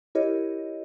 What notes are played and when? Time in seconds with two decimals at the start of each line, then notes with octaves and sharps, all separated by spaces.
0.15 E4 G4 A#4 C#5 D#5